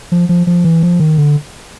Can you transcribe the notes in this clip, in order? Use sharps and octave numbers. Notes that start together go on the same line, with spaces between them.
F3
F3
F3
E3
F3
D#3
D3